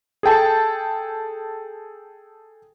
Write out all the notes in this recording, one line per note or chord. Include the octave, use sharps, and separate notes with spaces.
G#4 A4 G5 A5